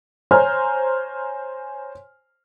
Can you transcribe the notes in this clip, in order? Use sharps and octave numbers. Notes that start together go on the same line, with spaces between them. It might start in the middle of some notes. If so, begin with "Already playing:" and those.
C5 C#5 G#5 A#5 F6